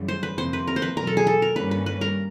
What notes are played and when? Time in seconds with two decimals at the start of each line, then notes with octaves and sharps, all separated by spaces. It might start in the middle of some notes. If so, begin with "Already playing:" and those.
Already playing: F#2 C#3 E3 G3
0.08 C5
0.23 B4
0.38 F2 C3 F3 A#3 C5
0.53 B4
0.68 A#4
0.76 C5
0.82 B4
0.97 E2 B2 F#3 A#4
1.07 A4
1.17 G#4
1.27 A4
1.42 A#4
1.56 G2 D#3 G3 A#3 C#4 B4
1.71 B4
1.86 B4
2.01 A#4